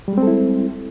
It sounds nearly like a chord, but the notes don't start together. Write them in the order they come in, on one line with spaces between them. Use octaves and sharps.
G3 G#3 C4 A4 E4